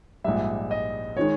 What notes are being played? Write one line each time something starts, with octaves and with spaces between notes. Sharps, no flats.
A#1 G#2 G3 E5
D#5
D#3 G#3 C#5